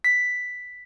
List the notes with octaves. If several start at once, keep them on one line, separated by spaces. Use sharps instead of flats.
B6